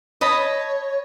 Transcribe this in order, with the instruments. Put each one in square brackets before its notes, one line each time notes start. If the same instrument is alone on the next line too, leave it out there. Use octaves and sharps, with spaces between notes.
[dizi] C#5 [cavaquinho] D#5 A5 B5